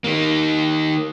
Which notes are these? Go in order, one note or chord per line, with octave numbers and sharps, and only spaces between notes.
D#3 A#3